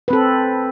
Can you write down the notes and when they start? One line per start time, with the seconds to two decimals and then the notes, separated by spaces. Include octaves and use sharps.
0.08 B4
0.10 C4
0.13 A4